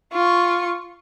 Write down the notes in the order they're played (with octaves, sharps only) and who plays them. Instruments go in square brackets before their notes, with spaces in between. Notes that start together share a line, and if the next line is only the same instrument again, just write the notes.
[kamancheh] F4 C#6